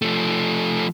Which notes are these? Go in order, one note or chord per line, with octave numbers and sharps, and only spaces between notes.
F3 A3